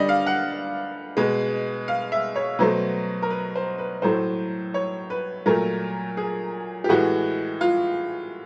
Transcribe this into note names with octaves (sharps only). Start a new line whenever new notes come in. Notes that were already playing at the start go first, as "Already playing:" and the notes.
Already playing: D3 G3 D5 D#5
F5
F#5
B2 G#3
F5
E5
C#5
B2 F#3 A3 C5
A#4
B4
C5
B4
A2 F#3 A3 C5
C#5
B4
A#2 F#3 A3 A#4
G#4
G4
A2 E3 G#3 F#4
F4